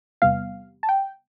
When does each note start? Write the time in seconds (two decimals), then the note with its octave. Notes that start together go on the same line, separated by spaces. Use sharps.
0.22 E2 C3 G3 B3 F5
0.83 A5
0.89 G5